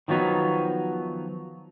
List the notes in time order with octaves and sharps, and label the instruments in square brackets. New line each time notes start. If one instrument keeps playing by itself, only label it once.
[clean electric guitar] D#3 F3 F#3 B3 D#4